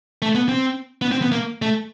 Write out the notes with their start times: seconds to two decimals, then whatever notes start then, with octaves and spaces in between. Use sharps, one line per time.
0.22 A3
0.35 B3
0.49 C4
1.02 B3
1.12 C4
1.22 B3
1.32 A#3
1.62 A3